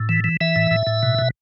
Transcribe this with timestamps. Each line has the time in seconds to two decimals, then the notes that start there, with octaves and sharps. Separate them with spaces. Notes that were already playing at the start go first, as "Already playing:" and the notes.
Already playing: A2
0.09 E3
0.24 E3
0.41 E3 E5
0.56 A2
0.71 A2
0.87 A2
1.03 B2
1.19 B2